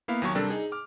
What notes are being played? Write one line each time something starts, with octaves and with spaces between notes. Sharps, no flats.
A#3 B3 E4 F5
D#2 F#3 C#6
C3 G3 C4 D4 A4 A#4
D#4 G#4
D6 F6